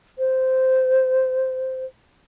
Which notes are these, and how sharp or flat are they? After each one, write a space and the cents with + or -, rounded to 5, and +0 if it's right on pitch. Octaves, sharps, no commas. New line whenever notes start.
C5 -10